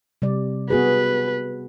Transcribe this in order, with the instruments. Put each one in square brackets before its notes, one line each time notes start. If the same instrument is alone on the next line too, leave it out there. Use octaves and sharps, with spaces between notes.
[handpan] C3 G3 D5
[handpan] B3 F#4 G#4 [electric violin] B4